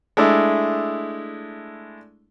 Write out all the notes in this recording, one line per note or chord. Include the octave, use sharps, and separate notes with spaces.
G#3 A3 D4 E4